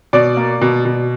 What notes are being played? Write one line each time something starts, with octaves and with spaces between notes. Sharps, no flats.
B2 D5
A#3
B2
B2